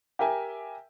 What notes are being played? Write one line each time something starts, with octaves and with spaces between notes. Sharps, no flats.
G4 A#4 E5 G5 G#5